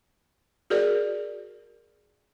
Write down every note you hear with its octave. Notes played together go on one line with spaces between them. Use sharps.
F#4 G#4 A#4 D5